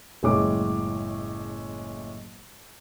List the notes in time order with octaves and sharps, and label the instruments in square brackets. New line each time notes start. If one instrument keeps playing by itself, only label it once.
[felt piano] F#1 A2 G#3 C#5 D6